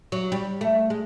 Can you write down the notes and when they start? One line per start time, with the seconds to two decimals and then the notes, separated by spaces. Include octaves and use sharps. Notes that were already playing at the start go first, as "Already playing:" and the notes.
0.12 F#3
0.32 G3
0.61 A3
0.90 G#3